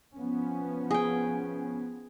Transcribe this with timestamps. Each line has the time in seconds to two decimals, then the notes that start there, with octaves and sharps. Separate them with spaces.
0.16 F3 B3 C#4
0.91 G#4 G5